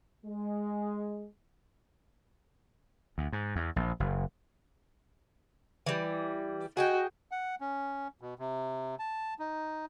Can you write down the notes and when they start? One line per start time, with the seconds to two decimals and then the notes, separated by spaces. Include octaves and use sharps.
0.25 G#3
3.18 D2
3.33 G#2
3.56 E2
3.76 A#1
4.00 F#1
5.86 E3 G3
6.77 F#4 G#4 D#5 G5
7.31 F#5
7.61 C#4
8.21 B2
8.39 C3
8.99 A5
9.39 D#4